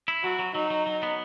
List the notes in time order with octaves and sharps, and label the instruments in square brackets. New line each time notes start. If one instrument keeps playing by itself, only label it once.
[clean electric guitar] E4
[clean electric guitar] F#3 [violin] F#4
[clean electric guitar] F#3
[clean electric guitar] F#3 [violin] D#4
[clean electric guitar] F#3
F#3
B3